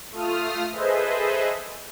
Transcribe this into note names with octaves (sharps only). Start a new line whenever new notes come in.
A3 F4 D#6 F6
G#4 A4 B4 C5 D#5 E5